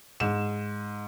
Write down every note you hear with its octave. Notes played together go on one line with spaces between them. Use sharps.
G#2 E7